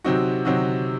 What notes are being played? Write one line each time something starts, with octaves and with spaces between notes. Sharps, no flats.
C3 F#3 C4 D#4 F#4
C3 F#3 C4 D#4 F#4